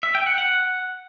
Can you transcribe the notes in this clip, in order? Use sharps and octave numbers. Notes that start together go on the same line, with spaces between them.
E5
G5
F#5
F#5